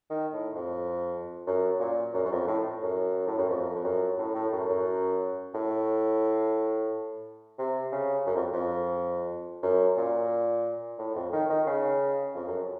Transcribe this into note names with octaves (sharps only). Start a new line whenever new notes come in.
D#3
A2
F2
F#2
A#2
F#2
F#2
F2
A2
F#2
A2
F#2
F2
F2
F#2
A2
A2
F#2
F#2
A2
C3
C#3
F#2
F2
F2
F#2
A#2
A2
F2
D#3
D#3
C#3
F2
F#2